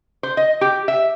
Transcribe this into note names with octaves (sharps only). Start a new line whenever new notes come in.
C5
D#5
G4
E5